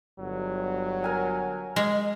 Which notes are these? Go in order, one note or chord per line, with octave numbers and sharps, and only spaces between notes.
G1 F#3
A#4 G#5 A#5
G#3